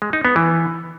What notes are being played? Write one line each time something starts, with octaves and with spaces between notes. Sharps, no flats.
G#3
D#4
B3
E3